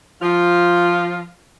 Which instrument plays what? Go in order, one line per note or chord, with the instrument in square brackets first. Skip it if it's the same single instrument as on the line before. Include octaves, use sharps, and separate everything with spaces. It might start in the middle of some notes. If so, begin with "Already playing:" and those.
[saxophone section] F3 F4